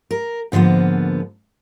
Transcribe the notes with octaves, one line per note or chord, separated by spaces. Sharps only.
A#4
G#2 D3 F3 A#3 B3